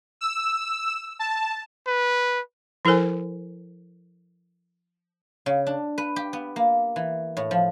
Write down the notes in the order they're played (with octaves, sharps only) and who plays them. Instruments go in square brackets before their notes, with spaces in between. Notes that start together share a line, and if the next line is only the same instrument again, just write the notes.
[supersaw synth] E6
A5
[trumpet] B4
[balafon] F3 E4 A4 A#4 C5 G#5
[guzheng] C#3
D4
B4
G4
B3
A#3
E3
A2
F3